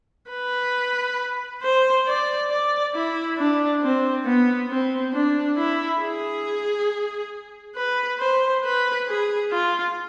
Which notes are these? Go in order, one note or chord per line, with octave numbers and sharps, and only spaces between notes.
B4
C5
D5
D5
E4
D4
C4
B3
C4
D4
E4
G#4
B4
C5
B4
G#4
F4